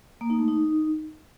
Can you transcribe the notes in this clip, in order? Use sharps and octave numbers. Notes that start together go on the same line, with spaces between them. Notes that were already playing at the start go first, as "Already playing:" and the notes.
A#3
D#4
A3
D#4